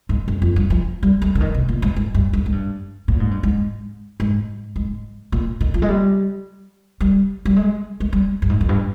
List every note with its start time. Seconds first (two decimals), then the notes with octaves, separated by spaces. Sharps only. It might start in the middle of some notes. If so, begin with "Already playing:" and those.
0.09 G#2
0.28 G2
0.42 F2
0.56 G2
0.70 F3
1.03 G3
1.22 G3
1.35 D3
1.40 D#3
1.54 C3
1.69 A#2
1.82 G#2
1.96 G#2
2.14 G2
2.33 G2
2.46 G#2
2.52 G2
3.08 A#2
3.20 G#2
3.31 G2
3.43 G#2
4.20 G#2
4.76 G#2
5.32 A#2
5.61 D#3
5.74 F3
5.82 G#3
5.88 G3
7.00 G3
7.45 G3
7.56 G#3
8.00 G#3
8.13 G3
8.42 G2
8.49 G#2
8.61 F2
8.69 G2